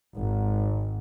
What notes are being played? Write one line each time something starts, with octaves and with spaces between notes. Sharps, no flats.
G#1